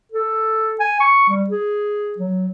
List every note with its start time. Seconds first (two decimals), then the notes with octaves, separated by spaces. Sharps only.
0.12 A4
0.80 G#5
1.00 C#6
1.29 G3
1.50 G#4
2.18 F#3